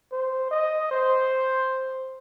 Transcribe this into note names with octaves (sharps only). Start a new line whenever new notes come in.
C5
D#5
C5